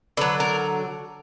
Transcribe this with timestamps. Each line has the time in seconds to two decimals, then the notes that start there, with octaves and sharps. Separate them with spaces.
0.17 D3 F#3 B4
0.40 A#4